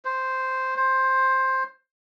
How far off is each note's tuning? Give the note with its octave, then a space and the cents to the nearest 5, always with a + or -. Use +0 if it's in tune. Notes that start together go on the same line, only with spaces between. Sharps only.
C5 -5
C5 +10